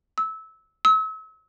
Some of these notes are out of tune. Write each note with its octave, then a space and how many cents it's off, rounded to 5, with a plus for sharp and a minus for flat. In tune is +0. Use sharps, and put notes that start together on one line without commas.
E6 -20
E6 -40